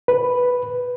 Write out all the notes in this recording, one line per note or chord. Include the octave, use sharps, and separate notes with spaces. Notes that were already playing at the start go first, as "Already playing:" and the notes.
B4